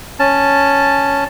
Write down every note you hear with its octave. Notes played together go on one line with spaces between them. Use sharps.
C#4 A5